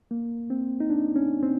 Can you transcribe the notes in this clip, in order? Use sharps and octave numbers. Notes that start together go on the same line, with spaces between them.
A#3
C4
D#4
D4
C#4
C4